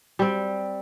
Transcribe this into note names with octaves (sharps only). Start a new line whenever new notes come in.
G3 C4